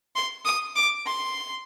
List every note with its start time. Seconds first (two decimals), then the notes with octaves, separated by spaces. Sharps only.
0.16 C6
0.45 D#6
0.76 D6
1.06 C6